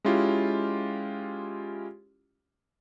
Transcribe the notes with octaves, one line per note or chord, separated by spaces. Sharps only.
G#3 C#4 E4 F4 G4